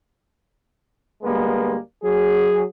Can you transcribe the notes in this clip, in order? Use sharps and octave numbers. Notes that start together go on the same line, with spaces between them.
D2 G3 G#3 A#3 B3
F#3 G#4